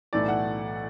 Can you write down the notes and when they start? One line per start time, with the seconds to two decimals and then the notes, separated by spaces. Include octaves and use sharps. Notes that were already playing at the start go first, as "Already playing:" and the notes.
0.13 B1 A2 E3 A3 E4 D5
0.28 F#5